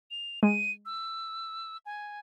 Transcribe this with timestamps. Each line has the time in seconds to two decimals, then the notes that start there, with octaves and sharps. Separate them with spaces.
0.11 F7
0.43 G#3 D#7
0.86 E6
1.86 G#5